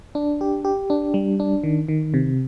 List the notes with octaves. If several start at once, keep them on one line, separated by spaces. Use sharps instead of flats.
D4
G4
G4
D4
G3
D4
D#3
D#3
C3